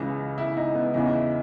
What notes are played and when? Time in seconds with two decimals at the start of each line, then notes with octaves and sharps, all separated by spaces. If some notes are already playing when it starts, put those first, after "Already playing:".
Already playing: C#2 C#3 E3
0.38 E4
0.57 D#4
0.75 B3
0.94 E2 C#3 E3 D#4
1.13 E4